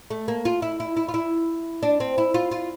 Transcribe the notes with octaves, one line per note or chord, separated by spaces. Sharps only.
A3
A#3
F4
E4
E4
E4
F4
E4
D4
C4
E4
F4
F4